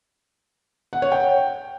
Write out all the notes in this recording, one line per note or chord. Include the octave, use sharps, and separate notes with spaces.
F#5
C#5
G5